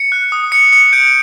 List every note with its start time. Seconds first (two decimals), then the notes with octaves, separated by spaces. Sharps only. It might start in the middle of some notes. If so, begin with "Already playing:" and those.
Already playing: C#7
0.12 F#6
0.32 D#6
0.52 D#6 C#7
0.73 D#6 C#7
0.93 G6 D7